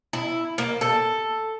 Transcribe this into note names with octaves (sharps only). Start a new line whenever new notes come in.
E4
A#3
A4